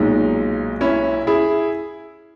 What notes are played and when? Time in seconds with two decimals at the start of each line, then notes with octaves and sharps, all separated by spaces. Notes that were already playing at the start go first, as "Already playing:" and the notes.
Already playing: B1 A#2 G#3 D#4
0.81 C#4 E4
1.27 E4 G#4